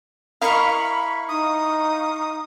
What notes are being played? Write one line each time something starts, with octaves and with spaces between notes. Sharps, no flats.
E4 A#4 D#5 F5 B5 C#6
D#4 D#6